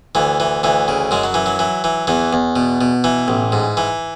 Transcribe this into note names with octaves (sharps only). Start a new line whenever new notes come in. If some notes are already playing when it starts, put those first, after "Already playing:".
D2 E3
E3
D2 E3
C#3
F#2 G#3
F#3
E3
F#3
E3
E3
E2 E3
E2
B2
B2
E3
A1
G#2
E3